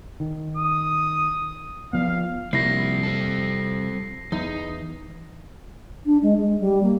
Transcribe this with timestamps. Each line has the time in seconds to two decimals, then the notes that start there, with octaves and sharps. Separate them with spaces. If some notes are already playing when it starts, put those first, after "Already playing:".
0.20 D#3
0.57 D#6
1.93 F3 B3 F5
2.53 C2 F3 A#3 A#6 C7
3.03 C4 A4
4.32 E2 D#4
6.06 D4
6.23 G#3
6.38 G#3
6.60 G3
6.83 A#3